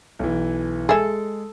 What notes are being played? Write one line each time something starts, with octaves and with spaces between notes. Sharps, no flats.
B1 E3
G#3 G#4 A4 E5